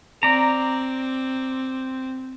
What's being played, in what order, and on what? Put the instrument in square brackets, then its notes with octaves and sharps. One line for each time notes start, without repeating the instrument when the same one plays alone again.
[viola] C4 [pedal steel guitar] D5 A#5